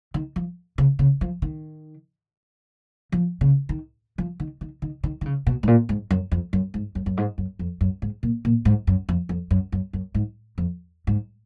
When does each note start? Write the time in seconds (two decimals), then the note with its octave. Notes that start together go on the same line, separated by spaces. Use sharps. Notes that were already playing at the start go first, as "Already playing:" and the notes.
0.14 D#3
0.36 F3
0.78 C#3
0.99 C#3
1.21 F3
1.42 D#3
3.12 F3
3.41 C#3
3.69 D#3
4.18 F3
4.40 D#3
4.61 D#3
4.82 D#3
5.03 D#3
5.21 D#3
5.26 C#3
5.47 B2
5.63 G#2
5.67 A#2
5.89 G#2
6.11 F#2
6.31 F2
6.53 F#2
6.74 G#2
6.95 F#2
7.06 F#2
7.17 G#2
7.38 F#2
7.59 F2
7.81 F#2
8.02 G#2
8.23 A#2
8.45 A#2
8.65 G#2
8.87 F#2
9.09 F2
9.29 F2
9.51 F#2
9.72 F#2
9.93 F#2
10.14 G#2
10.58 F2
11.07 G#2